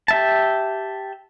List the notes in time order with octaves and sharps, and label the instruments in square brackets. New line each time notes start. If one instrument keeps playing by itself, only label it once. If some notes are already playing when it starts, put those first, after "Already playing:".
[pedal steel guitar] G4 E5 A5